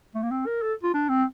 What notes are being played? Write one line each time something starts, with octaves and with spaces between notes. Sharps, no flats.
A3
A#3
C4
A#4
A4
F4
D4
C4